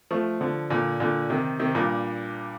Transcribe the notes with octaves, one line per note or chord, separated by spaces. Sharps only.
F3 A3
D3 F3
A#2 D3
A#2 D3
C3 D#3
C3 D#3
G2 A#2